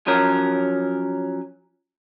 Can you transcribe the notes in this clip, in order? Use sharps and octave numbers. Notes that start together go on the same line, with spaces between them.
F3 F#3 C#4 A#4